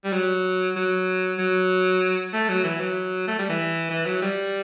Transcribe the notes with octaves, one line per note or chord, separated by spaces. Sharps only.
G3
F#3
F#3
F#3
A3
F#3
E3
F#3
A3
G3
E3
E3
F#3
G3